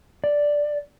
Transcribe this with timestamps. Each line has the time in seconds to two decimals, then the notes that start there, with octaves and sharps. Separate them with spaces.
0.24 D5